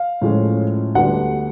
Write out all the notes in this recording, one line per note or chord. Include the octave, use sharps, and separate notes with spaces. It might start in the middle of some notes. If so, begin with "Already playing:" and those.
Already playing: F5
A2 F3 G#3 C#4
D2 D3 G3 B3 D4 F#5